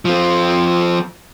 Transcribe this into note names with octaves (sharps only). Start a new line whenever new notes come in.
F3 C4